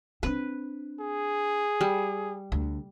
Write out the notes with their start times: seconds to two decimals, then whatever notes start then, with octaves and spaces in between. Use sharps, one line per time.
0.23 C4 D4 B4
1.00 G#4
1.81 G3
2.52 D2